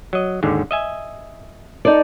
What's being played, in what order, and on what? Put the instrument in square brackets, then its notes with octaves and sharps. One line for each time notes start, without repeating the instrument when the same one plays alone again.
[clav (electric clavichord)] F#3 D#5
D#2 G#2 D3
D#5 E5 G#5
[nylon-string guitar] D#4 A4 D5